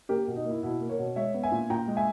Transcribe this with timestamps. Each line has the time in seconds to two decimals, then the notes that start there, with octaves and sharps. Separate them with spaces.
0.09 A#3 G4 A#4
0.27 B2
0.36 D#4
0.45 A#3 E4
0.63 B2 E4
0.81 A#3
0.89 A#4 C#5
0.99 B2
1.16 G#3 C#5 E5
1.34 B3
1.43 E5 G#5
1.52 A#2
1.70 A#2 G5 A#5
1.88 G#3
1.97 E5 G#5